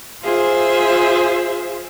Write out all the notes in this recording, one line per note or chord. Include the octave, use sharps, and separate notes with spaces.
F4 G#4 C5 E5